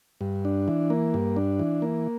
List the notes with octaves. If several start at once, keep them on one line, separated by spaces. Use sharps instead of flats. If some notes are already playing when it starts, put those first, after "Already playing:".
G2
D4
E3
A#3
G2
D4
E3
A#3